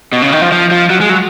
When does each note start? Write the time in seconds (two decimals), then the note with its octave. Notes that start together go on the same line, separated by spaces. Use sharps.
0.12 B2
0.22 C#3
0.32 D#3
0.42 F3
0.52 F3
0.71 F3
0.90 F#3
1.00 G#3
1.09 F#3